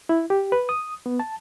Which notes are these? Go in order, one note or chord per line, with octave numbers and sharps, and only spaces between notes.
E4
G4
B4
D#6
B3
A5